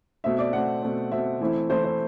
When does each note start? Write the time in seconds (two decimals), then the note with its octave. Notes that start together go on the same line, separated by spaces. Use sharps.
0.24 B2 A3 C4 E5
0.39 D5
0.53 B2 A3 C4 F#5
0.83 B2 A3 C4
1.12 B2 A3 C4 E5
1.41 E3 A3 C4 E4
1.70 E3 A3 C4 E4 C5
1.84 C5